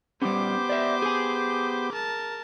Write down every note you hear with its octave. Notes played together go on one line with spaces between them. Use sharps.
G3 B3 C#4 G4 C5 D6
D5 E5
G#4 G#5
A#4 A5